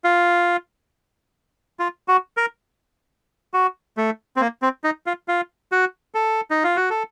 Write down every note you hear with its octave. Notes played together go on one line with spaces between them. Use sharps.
F4
F4
F#4
A#4
F#4
A3
C4
A#3
C4
D#4
F4
F4
F#4
A4
D#4
F4
F#4
A4